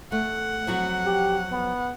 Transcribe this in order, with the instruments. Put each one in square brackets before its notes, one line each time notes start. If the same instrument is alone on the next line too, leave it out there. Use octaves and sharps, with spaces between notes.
[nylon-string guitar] A3 [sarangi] F#5
[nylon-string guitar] F2 F#3 F#4
[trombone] G4
B3